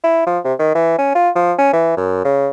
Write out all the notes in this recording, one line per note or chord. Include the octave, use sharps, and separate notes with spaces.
E4
F3
C3
D#3
E3
C#4
F4
F3
C#4
E3
F#2
C#3